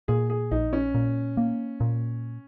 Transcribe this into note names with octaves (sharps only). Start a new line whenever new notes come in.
A#2 G#4
G#4
A#1 D#4
C#4
A#2
A#3
A#2